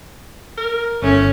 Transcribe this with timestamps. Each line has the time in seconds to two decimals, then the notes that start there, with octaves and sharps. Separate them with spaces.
0.58 A#4
1.02 G1 A2 C#4